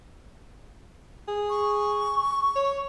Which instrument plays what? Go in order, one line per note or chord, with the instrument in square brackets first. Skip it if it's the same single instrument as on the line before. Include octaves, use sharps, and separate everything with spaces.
[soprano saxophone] G#4
[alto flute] C#6
[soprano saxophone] C#5